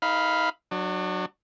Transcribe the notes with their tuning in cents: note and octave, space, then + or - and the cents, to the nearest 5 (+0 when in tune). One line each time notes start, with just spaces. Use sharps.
D#4 +30 F5 +0 B5 +0
F#3 +0 D4 +40